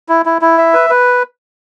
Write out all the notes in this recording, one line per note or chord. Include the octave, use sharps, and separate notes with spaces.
E4
E4
E4
E5
B4
B4